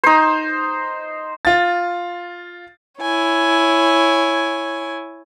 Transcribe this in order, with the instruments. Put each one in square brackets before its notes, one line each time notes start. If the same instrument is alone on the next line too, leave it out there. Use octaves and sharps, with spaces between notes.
[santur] D#4 C5
[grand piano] F4 A6
[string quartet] E4 C#5 G#5